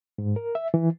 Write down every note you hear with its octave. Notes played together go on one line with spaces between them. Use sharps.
G#2
A#4
E5
E3